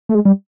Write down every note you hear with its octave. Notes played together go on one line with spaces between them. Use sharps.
A3
G#3
G3